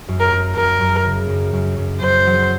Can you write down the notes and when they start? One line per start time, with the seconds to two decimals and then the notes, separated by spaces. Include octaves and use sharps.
0.08 F#2
0.20 A#4
0.32 F#2
0.56 F#2 A#4
0.81 F#2
1.05 C#3
1.29 F#2
1.53 F#2
1.78 F#2
2.02 F#2 C5
2.27 F#3